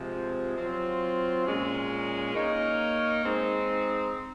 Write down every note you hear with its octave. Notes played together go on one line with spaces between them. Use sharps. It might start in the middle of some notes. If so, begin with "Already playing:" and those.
Already playing: C3 F3 G#3
F#3 C4 F4
A#2 G#3 C#4
A#3 D#4 A#4 C#5
G#3 C4 D#4